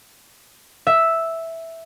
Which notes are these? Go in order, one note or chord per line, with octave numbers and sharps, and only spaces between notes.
E5